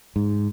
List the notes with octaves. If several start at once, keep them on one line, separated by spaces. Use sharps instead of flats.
G#2